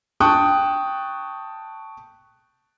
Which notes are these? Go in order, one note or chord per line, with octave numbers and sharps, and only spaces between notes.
G5 A5 C#6 D#6 F#6